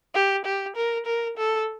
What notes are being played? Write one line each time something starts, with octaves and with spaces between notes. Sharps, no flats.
G4
G4
A#4
A#4
A4